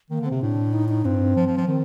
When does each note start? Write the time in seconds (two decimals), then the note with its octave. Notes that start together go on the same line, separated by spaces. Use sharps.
0.11 D#3 A#3
0.21 D3 C4
0.31 C3
0.42 A2 D4
0.73 D#4
0.89 D#4
1.05 G2 C4
1.36 F3
1.47 F3
1.57 F3
1.67 D#3 C4